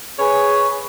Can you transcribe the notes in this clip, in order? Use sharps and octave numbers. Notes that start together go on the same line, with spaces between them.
G#4 B4 C#5 G#5